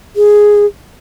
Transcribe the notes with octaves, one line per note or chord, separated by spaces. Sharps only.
G#4